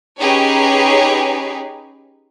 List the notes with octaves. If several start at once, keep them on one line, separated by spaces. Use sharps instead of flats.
C#4 D#4 G4 G#4 B4 C#5